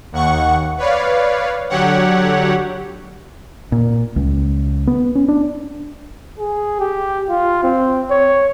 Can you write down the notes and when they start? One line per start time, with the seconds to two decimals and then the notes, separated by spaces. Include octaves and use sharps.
0.12 D#2 F#5 C#6
0.78 B4 C#5 D5 F5
1.69 D3 F#3 G4 C#5 F#5
3.72 A#2
4.16 C#2
4.87 B3
5.15 C#4
5.28 D4
6.39 G#4
6.80 G4
7.29 F4
7.63 C4
8.11 C#5